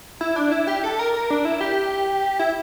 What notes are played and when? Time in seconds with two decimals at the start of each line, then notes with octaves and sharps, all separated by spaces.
0.21 E4
0.36 D4
0.52 E4
0.67 G4
0.84 A4
0.99 A#4
1.14 A#4
1.30 D4
1.45 E4
1.61 G4
2.39 E4